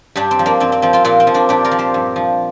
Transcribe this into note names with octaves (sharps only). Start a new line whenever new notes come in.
G2 D4 G4
C4
F3
A#3 D4
G2 C4
C4
F3 C4
C4 F4
A#2 C4 F4
C4
F3
A#3 D4
A#2 D4 G4
F4 A#4
F3
G4 C5
G2
F3